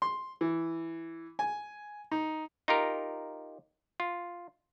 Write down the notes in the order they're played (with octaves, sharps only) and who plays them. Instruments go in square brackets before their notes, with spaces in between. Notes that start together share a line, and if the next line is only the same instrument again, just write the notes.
[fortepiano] C6
E3
G#5
D#4
[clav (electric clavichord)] D#4 F4 G4 A#4
F4